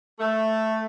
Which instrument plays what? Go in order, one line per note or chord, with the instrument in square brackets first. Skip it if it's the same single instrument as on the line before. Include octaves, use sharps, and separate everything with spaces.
[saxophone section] A3